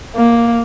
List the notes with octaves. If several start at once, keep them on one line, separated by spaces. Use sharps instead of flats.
A#3